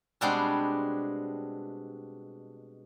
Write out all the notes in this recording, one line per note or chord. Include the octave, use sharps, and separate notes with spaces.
B2 G3 G#3 B3 C4 D4